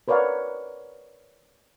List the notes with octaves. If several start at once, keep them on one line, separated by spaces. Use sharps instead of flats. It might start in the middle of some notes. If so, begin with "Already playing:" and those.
A#4 B4 C#5 D5 F5 F#5